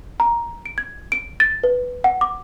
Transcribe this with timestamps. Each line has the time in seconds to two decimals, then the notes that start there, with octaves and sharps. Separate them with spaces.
0.20 A#5
0.66 D7
0.78 G#6
1.12 D7
1.40 A6
1.64 B4
2.04 F#5
2.21 D6